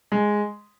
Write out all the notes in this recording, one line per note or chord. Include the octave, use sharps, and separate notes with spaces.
G#3